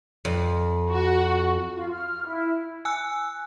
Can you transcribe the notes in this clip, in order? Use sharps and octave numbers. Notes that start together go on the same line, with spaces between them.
F2
F#4
F4
F6
E4
G#5 E6 F#6